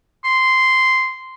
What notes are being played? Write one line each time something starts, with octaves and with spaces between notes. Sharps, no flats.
C6